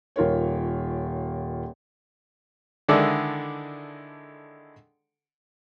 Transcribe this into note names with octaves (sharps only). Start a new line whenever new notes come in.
D#1 F4 A#4 C#5
D3 D#3 G#3 E4 A4 D5